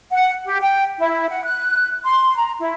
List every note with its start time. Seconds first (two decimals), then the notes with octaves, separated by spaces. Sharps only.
0.11 F#5
0.45 G4
0.61 G5
0.99 E4
1.30 F#5
1.44 F#6
2.04 C6
2.37 A#5
2.60 E4